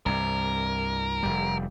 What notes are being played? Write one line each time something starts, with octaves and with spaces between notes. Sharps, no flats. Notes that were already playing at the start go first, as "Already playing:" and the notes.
C2 G2 A#4
F1 B1 G3